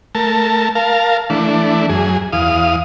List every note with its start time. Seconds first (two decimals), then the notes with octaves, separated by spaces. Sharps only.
0.15 A3 A#4 A5
0.75 A#4 F5 A5
1.30 E3 A3 D4
1.89 F#2 G#4
2.33 E2 F5 D#6